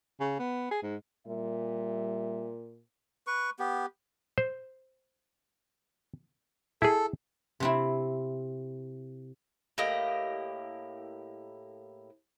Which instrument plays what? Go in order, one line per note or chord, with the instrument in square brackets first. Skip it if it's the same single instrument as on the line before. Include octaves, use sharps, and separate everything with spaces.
[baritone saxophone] C#3
B3
G#4
G#2
[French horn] A#2 [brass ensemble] G3 E5
[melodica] B4 C#6
B3 G4
[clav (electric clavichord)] C5
[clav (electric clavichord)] E4 G#4 [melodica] A4
[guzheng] C3 C4 E4
[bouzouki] A2 A#3 G4 D#5